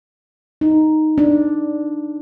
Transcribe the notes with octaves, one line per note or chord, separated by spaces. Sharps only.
D#4
D4